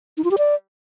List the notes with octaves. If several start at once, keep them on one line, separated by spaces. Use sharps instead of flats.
D#4
F4
G4
D5